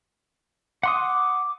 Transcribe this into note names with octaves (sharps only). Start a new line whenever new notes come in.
F#5 C6 D6 D#6